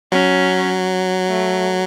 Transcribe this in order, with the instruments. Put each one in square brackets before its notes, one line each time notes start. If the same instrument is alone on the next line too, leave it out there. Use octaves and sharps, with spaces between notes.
[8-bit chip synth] F#3 [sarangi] C#4
[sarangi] A3